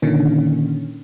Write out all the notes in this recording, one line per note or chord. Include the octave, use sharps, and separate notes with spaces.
A#2 D3 D#3 C#4